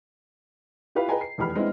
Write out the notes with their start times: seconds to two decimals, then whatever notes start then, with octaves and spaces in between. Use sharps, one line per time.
0.95 E4 F4 G4 B4 F5 B5
1.08 G#4 B4 D#5 G5 G#5 A#5
1.21 C7
1.38 F1 E2 G4 B5 F6
1.55 G#3 B3 C4 D4 E4